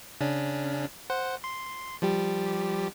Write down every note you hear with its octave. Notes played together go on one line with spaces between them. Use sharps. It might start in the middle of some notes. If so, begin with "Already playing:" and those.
C#3 C#4 D4
C5 F#5
C6
F3 G3 G4